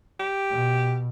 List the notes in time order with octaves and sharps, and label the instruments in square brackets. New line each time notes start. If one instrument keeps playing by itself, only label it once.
[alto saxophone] G4
[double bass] B2